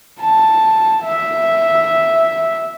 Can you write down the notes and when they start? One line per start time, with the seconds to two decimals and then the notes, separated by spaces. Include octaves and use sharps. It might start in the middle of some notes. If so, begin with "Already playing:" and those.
0.21 A5
1.04 E5